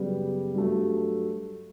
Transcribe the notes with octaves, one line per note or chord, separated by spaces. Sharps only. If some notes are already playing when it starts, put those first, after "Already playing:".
Already playing: F#2 C#3 G3 B3
G2 F#3 A3